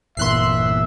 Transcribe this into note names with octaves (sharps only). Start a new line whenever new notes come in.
G1 E2 A#2 E5 C6 F#6 C7